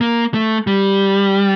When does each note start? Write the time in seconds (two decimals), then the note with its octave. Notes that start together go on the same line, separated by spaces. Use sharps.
0.01 A#3
0.34 A3
0.67 G3